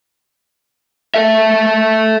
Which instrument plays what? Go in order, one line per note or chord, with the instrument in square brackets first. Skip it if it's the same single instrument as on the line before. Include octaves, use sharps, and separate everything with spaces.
[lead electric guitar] A4 E5